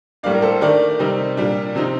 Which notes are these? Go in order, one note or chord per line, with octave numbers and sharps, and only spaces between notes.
A2 G3 A#3 D4 D5 F5
A#4
A4 C5
D#3 A3 D4 A#4 D5
C3 G3 C4 D#4
A#2 G3 D4
C3 F3 C4 D#4